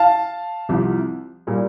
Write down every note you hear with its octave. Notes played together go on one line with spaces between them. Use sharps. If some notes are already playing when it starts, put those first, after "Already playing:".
Already playing: F5 A5
C2 C3 F3
A#2 G3